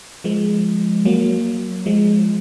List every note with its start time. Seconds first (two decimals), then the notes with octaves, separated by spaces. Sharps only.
0.24 F3 G#3
1.05 F#3 A#3
1.86 F3 G#3